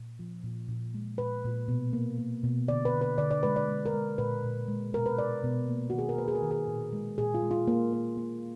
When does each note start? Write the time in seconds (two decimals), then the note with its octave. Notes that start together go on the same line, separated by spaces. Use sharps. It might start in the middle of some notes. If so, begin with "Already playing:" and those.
Already playing: A#2
0.19 F3
0.43 A#2
0.68 A#2
0.94 G#3
1.18 A#2 B4
1.44 A#2
1.68 B2
1.93 A#3
2.18 A#3
2.44 B2
2.68 D3 D5
2.85 B4
2.94 D3
3.01 B4
3.18 D3 D5
3.31 D5
3.43 G#3 B4
3.56 D5
3.68 G#3
3.86 A#4
3.93 G#3
4.18 A#2 B4
4.44 A#2
4.68 G#3
4.93 B2 A#4
5.06 B4
5.18 B2 D5
5.44 B2
5.68 A#3
5.90 D#3 F#4
5.99 G#4
6.09 A#4
6.18 A#3 B4
6.28 G#4
6.35 A#4
6.42 D#3
6.51 G#4
6.68 A#2
6.93 G#3
7.18 A#2 G#4
7.34 F4
7.42 G#3
7.51 F4
7.68 A#3
7.93 A#3
8.17 A#3